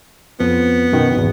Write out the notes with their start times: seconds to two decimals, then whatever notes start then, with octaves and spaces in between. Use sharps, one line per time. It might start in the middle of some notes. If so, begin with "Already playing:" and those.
0.40 F2 F3 B3
0.92 F#2 B2 D#3
1.14 G#1 E2